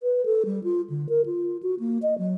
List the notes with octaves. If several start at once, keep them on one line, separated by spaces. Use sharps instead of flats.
B4
A4
G3
F4
D3
A#4
F4
F#4
A#3
D#5
F#3